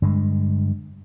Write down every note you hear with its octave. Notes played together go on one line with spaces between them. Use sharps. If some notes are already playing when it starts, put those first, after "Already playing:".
G2 D3 G#3